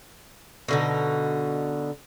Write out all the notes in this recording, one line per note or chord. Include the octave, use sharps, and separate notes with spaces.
B2 D3 D#4